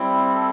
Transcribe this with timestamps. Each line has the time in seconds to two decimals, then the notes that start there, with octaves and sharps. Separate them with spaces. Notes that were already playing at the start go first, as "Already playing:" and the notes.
Already playing: G3 C4 E4
0.34 A4